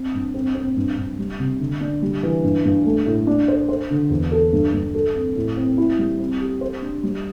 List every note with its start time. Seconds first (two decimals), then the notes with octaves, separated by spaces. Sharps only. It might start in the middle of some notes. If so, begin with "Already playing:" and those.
Already playing: C4
0.14 G2
0.34 C4
0.55 C4
0.76 G2
0.97 G2
1.19 G3
1.39 C3
1.59 D3
1.81 D4
2.02 G3
2.23 E3
2.44 G2
2.65 G2
2.86 A3
3.06 A2
3.27 D4
3.48 C5
3.69 C5
3.90 D3
4.10 E2
4.32 A4
4.53 G2
4.73 G2
4.95 A4
5.15 C4
5.36 A2
5.57 C4
5.78 E4
5.99 G3
6.20 C4
6.41 G4
6.61 C5
6.82 D4
7.03 G3